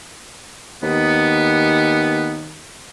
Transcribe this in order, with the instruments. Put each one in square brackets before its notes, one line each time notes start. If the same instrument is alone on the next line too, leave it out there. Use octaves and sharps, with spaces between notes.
[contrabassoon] D#2 [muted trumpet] B3